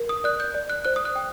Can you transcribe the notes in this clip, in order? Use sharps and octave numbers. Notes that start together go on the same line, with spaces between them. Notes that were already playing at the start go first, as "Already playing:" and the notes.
Already playing: A#4
D#6
D5 F#6
G6
D5
F#6
C5 F#6
D#6
F#6
G5